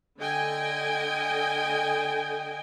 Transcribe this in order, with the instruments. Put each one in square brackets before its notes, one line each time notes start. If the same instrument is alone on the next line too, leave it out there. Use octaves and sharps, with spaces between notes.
[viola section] D3 D#5 G5 G#5